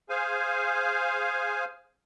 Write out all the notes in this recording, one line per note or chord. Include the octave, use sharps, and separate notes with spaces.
G#4 C5 F5 G#5